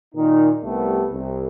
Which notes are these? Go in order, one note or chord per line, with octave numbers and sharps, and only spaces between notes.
A#2 D#3 D#4
C2 G3 A3 B3
C2